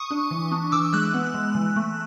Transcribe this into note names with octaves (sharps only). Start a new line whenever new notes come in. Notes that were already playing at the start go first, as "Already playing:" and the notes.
Already playing: C#6 D#6
D4
E3
D4
E3 D6 E6
G#3 E6 F#6
B3
G#3
E3
A3